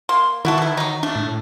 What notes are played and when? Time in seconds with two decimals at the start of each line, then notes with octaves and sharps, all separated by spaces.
0.09 A#3 C6
0.45 D#3 E4 F#4 A4
0.58 B2 E4
0.77 F#3 D#4
1.03 A3 D4
1.16 A2